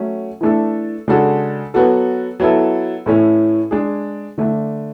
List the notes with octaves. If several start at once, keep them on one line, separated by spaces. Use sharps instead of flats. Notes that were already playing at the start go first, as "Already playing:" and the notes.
Already playing: F#3 A3 C#4
E3 A3 D4 A4
C#3 G#3 D4 F#4 A4
F#3 B3 F#4 A4
F#3 B3 E4 A4
A2 E3 A3 C#4 E4
G#3 D4 G#4
D3 A3 D4